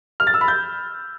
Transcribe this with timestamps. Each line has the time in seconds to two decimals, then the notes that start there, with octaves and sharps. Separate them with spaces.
0.20 F6
0.27 A6
0.34 E6
0.41 B5
0.48 G6